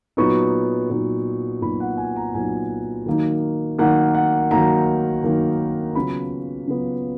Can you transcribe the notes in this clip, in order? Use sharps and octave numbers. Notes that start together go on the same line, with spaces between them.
A#2 F#3 B3 D#4 C#6
A#2 F#3 B3 D#4
A#2 F#3 B3 D#4 B5
F#5
G#5
A#5
A#2 F#3 B3 D#4 G#5
D#3 F#3 A#3 D#4
D#3 F#3 A#3 D#4 F#5
F#5
D#3 F#3 A#3 D#4 A#5
D#3 F#3 A#3 D#4
C#3 F#3 B3 F4 B5
C#3 F#3 B3 F4